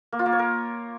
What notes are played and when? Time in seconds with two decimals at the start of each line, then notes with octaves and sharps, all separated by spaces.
0.12 A#3
0.19 F4
0.26 A#3
0.32 C#5
0.39 A#4